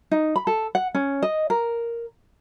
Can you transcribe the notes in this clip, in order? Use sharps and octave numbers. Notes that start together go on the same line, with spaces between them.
D#4
B5
A4
F#5
C#4
D#5
A#4